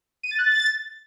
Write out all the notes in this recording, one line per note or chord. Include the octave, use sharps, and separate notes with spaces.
D#7
A6
F#6
A6